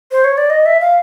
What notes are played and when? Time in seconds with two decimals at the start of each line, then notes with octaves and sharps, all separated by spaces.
0.11 C5
0.24 C#5
0.37 D5
0.50 D#5
0.66 E5
0.81 F5